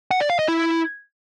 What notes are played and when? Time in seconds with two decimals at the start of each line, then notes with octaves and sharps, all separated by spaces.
0.11 F#5
0.20 D5
0.30 F5
0.39 D#5
0.48 E4